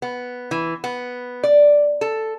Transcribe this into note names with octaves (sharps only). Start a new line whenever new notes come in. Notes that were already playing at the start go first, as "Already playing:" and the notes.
B3
E3
B3
D5
A4